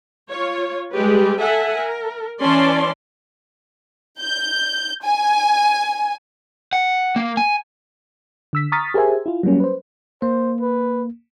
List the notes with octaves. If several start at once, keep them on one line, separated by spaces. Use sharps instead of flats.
F4 C#5
G3 G#3 G4 B4
A4 E5 F#5 G#5
A#4
E3 C#4 D5 A5 C6
G6
G#5
F#5
A#3
G#5
D3 E6 B6
A#5 C#6 D#6 F6 A6 B6
G4 G#4 A#4 C5 E5 G#5
E4 F4
F#3 G3 A#3 C#4
B4 C5
A#3 C5
B4